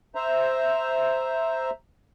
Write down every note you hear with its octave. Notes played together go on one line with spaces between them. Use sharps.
C5 E5 A#5